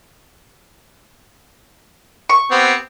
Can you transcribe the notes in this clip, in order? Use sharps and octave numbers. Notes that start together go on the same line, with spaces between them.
C#6
B3 C4 G4